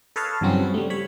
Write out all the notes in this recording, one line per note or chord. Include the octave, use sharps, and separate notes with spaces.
A4 B4 C#5 D#5 F5 A5
G2 C#3 E3 F#3 C4 C#4
G3 A3
C#5 B5